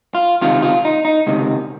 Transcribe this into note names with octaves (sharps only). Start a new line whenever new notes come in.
F4
C#2 C3 D#3 F4
F4
D#4
D#4
C#2 C3 D#3